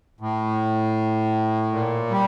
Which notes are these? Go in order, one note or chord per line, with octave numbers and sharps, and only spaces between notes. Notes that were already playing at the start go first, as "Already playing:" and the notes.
A2
A#2
G3